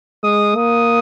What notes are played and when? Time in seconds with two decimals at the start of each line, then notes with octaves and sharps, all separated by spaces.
0.23 G#3 D#6
0.56 A#3 D#6